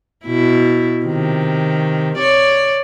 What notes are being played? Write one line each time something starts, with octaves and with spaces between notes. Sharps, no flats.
B2 E4
C3 D#3
C#5 D5